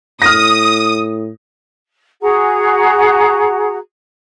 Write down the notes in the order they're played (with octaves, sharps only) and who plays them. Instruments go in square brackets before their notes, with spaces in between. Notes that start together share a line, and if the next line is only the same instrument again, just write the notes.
[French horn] A2 [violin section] D#6 [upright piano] F6 A#6
[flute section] F#4 G#4 F#5 A#5